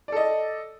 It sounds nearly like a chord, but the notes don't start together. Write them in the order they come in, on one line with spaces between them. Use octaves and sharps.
D5 A4 D#5